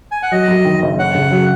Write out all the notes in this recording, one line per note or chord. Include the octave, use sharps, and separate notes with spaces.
G#5
F#5
F#3 D#5
F#2
D#3
F#1
C#4 F#5
C#3
F#3